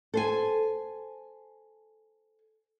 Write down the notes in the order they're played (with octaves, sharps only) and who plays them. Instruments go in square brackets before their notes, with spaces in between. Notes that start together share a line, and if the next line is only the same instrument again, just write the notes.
[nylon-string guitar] A4 C5 G#5